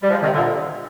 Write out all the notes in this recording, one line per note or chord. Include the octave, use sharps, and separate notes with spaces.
G3
F3 G#3
C3 D#3
A#2 D3